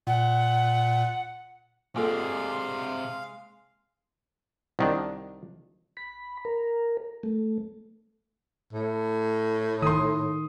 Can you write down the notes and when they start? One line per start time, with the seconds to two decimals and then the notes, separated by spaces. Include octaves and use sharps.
0.07 A#2 F#5
1.96 C3 G#3 A#3 D4 F4 A4 F5
4.79 C2 D#3 D4
5.97 B5
6.45 A#4
7.23 A3
8.73 A2
9.82 D#3 C6 D#6